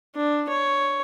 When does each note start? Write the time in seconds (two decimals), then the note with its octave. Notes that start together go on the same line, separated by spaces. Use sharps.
0.15 D4
0.49 C#5